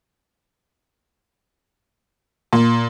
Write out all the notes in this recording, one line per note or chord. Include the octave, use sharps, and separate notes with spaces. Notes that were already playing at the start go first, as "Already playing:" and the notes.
A#2